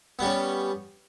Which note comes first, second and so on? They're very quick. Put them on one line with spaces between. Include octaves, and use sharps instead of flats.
B3 G3 C#4